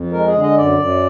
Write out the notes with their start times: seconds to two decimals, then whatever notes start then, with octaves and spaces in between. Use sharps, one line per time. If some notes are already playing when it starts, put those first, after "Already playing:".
Already playing: F2
0.12 G#3 A#4
0.27 G#4
0.34 D3
0.42 D#5
0.57 F#2 D5
0.79 F#2